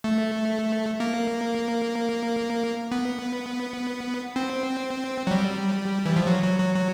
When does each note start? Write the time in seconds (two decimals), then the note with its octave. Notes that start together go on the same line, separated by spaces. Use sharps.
0.04 A3
1.00 A#3
2.92 B3
4.36 C4
5.27 F#3
5.31 G3
6.06 E3
6.16 F3
6.27 F#3
6.43 F#3
6.59 F#3
6.75 F#3